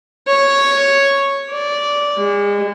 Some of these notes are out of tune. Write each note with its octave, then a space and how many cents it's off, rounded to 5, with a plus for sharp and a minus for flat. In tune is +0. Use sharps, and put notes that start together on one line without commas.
C#5 -5
D5 -10
G#3 -35